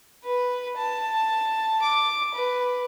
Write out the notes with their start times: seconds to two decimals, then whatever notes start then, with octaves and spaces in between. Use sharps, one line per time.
0.24 B4
0.77 A5
1.82 D6
2.34 B4